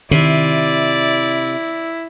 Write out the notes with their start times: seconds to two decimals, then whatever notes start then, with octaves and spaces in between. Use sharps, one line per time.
0.11 C3 D#3 E4 D5